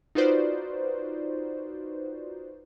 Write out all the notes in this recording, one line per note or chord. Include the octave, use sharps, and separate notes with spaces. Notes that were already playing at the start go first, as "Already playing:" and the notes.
D#4 F4 F#4 B4 C5 D5